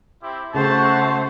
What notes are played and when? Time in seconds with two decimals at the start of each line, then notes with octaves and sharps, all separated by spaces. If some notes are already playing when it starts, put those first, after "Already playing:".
0.23 C4 E4 G4
0.54 C#3 A3 F#4 C5 A5